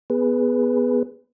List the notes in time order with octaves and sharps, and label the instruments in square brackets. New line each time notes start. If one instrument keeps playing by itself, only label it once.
[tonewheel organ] B3 G#4 B4